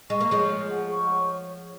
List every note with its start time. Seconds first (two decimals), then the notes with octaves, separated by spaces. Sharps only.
0.10 G#3 C#6
0.21 A#3
0.30 F3 G#3 C#5
0.50 G#4
0.70 F#5
0.90 C#6
1.10 C#5